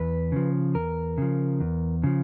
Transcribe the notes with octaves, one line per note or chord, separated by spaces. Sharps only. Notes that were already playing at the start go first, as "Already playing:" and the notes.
Already playing: E2 B4
C#3 F3
E2 A#4
C#3 F3
E2
C#3 F3